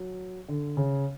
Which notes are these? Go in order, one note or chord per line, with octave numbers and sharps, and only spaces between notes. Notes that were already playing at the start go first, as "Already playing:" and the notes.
Already playing: F#3
D3
C#3